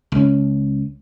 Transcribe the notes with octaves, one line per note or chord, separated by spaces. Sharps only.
C#2 C#4